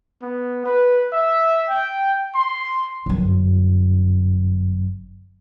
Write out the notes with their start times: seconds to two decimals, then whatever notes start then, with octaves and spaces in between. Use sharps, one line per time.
0.22 B3
0.65 B4
1.12 E5
1.69 G5
2.35 C6
3.06 G1 F#2